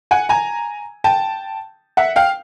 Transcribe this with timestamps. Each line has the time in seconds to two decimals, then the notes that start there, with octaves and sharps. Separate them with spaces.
0.11 F#5 G#5
0.29 G#5 A#5
1.04 G5 A5
1.97 E5 F#5
2.16 F5 G5